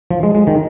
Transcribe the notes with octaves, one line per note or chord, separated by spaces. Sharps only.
F3
G#3
G#3
D#3